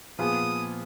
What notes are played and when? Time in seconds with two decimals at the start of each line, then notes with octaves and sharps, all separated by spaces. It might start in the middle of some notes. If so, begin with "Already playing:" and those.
0.19 A#2 F3 B3 F4 G#4 D#6